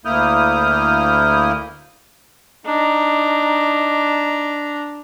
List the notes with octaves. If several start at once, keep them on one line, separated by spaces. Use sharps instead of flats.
D2 A#3 E4 D#6 F6 G6
D4 D#4 A#5